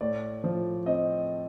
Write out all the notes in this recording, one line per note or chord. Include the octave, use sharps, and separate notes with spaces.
A2 D5
F3
C4 D#5